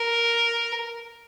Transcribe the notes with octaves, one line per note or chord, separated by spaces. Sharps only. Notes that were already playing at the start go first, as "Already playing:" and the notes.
Already playing: A#4